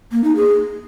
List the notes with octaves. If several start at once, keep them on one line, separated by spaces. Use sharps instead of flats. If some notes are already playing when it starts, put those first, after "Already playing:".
A#3
D#4
G#4